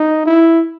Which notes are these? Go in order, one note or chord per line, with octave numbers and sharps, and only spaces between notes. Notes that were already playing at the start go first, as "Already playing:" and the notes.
Already playing: D#4
E4